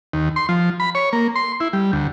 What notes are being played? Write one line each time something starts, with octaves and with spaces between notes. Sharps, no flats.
D#2
C6
F3
B5
C#5
A#3
C6
E4
G3
D2